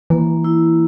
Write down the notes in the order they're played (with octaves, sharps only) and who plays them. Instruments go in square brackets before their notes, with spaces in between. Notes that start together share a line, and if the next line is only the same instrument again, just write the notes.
[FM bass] E3 [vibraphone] A#3
[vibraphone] E4